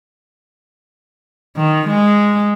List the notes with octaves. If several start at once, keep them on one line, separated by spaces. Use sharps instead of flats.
D#3
G#3